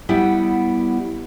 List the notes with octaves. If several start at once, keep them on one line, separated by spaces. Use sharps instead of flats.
G3 B3 E4 F#5 G5